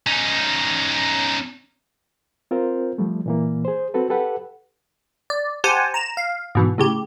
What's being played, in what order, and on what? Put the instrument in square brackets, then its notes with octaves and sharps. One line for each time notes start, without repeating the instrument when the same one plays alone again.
[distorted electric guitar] C#4 D#4
[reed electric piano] C4 F4 A#4 C5
F3 G3 A3
A#2 E3 A#3
G#4 C5
C4 F#4 A4 B4
G4 A4 B4 F#5
[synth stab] D5
G4 C5 F#5 G#5 A5
A#5 E7
F5
G#2 B2 E3
A2 C#3 G4